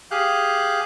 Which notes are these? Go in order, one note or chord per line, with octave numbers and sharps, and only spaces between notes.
G4 G#4 F5 F#6 G6